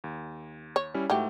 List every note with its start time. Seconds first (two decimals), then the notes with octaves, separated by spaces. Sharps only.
0.04 D#2
0.76 C#5
0.94 G3 C#4 E4
1.10 G#2 E3 F#3 A3 G4